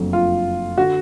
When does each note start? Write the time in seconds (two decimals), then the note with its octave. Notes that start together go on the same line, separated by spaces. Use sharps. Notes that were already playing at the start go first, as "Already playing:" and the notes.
Already playing: F#1 F2 D3 F#3 A3
0.13 F4
0.78 D3 F#4